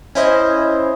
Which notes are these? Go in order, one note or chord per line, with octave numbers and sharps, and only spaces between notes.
C#4 E4 C5 D#5